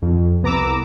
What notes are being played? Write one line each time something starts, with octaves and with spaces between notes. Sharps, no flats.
F2
C2 B3 A#5 D6 E6